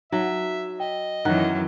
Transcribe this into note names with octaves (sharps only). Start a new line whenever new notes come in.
F#3 D#4 E5
D#5 G5
F#2 D#3 E3 F#3 F#5 A#5 F#6